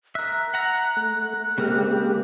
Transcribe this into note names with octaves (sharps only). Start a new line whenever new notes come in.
A#4 E5 F#6
F#5 A#5
A3
C#3 G#3 A#3 C4 G4 F6